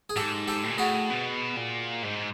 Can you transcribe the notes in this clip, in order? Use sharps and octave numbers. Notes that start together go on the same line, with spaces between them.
G#4
G#2 G4 A4
G4 A4
A2
A#2
A2 F#4 G#4
B2
A#2
G#2